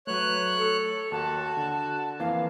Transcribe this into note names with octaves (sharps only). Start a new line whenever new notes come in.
F#3 A3 B4 C#5 F#6
A4 C#7
D#2 D#4 F#4 A5
D3
F2 E3 A#3 F5